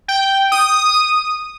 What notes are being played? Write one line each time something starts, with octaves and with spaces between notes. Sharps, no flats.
G5
D#6